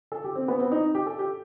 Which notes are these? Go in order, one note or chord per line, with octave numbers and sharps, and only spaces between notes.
A4
G4
C4
B3
C4
D#4
G4
A4
G4